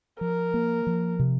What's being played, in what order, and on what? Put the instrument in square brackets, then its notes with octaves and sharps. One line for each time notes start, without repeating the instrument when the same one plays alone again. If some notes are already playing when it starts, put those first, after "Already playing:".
[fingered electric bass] F3 [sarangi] A#4
[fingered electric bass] A#3
F3
C3